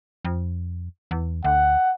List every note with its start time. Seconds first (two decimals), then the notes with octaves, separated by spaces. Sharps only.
0.25 F2
1.11 E2
1.44 D2 F#5